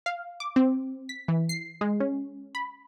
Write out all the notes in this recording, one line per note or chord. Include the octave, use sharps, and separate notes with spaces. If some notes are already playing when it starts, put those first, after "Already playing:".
F5
D6
C4
B6
E3
C7
G#3
C#4
B5